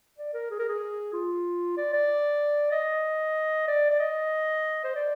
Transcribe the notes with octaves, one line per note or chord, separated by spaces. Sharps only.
D5
A#4
G#4
A#4
G#4
F4
D5
D5
D#5
D5
D5
D#5
C5
D5